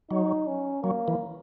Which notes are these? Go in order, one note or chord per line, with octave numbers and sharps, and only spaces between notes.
F#3 D#4
C#4
F#3 A#3
E3